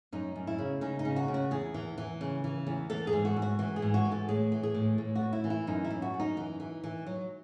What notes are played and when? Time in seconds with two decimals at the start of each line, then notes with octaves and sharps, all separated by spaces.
0.12 F#2 D#4
0.35 F#2
0.47 E4
0.58 C#3
0.81 C#3 D#4
0.99 D#4
1.05 C#3
1.16 F#4
1.28 C#3
1.34 F#4
1.51 E2 G#4
1.74 E3
1.98 E3
2.21 C#3
2.44 E3
2.67 E2
2.90 E3 A4
3.07 G#4
3.13 G#2
3.25 F#4
3.36 G#2
3.42 F#4
3.59 E3 F#4
3.76 G#4
3.82 G#2
3.94 F#4
4.05 E3
4.12 A4
4.28 A2 G#4
4.52 E3
4.63 G#4
4.75 A2
4.98 A2
5.15 F#4
5.21 A2
5.33 E4
5.44 E3
5.50 E4
5.67 F#2 D#4
5.84 E4
5.91 F#2
6.02 F#4
6.14 F#2
6.20 D#4
6.37 E3
6.60 E3
6.84 E3
7.07 F#3